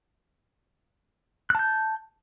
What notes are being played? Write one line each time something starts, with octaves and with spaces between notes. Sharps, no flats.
A5 F#6 G6